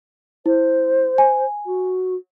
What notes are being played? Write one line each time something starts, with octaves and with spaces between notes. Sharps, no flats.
E4 C5
G#5
F#4